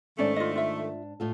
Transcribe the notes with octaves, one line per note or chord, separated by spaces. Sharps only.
G#2 D#3 A3 C#4 D4 D5
F4 D#5
F4 E5
A2 F4 A4